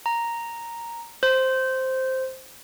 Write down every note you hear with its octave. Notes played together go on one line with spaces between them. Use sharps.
A#5
C5